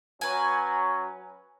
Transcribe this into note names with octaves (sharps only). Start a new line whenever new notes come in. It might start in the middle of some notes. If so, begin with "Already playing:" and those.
F#3 C#4 B4 G#5